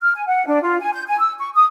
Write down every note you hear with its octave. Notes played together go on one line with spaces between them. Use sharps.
F6
G#5
F#5
D4
F4
G#5
G6
G#5
E6
C#6
D#6